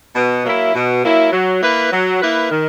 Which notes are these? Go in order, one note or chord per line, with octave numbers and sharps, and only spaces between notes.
B2
F#3 A#3 E4
B2
F#3 A#3 E4
F#3
A#3 E4 B4
F#3
A#3 E4 B4
D#3